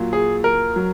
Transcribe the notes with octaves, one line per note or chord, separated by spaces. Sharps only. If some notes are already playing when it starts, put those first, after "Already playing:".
Already playing: A#2 F#3
G#4
A#4
F#3